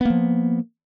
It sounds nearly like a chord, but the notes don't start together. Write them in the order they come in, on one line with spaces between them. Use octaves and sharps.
B3 A#3 F3